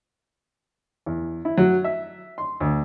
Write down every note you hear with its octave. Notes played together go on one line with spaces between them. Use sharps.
E2
E4
F#3
E5
C6
D2